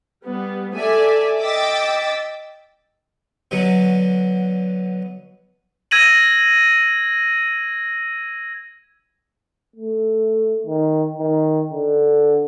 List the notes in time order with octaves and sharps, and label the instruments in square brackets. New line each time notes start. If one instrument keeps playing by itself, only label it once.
[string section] G3 B3
A4 D5 E5 G#5
D#5 G5 D6 E6 A6 B6
[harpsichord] B2 D3 F#3
[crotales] E6 G#6 A#6 D#7 F#7
[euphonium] A3
D#3
D#3
D3